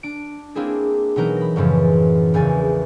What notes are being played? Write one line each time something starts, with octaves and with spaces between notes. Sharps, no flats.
D4 D7
A#3 C4 D4 E4 G#4
B2 E3 F#3 B3 D#4 A#4
B5 A#6
F#2 A2 C#3 E3 F3 G#3
A#1 E2 C#3 G#5 A6